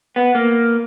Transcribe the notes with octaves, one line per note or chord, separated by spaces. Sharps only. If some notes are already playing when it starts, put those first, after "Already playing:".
B3
A#3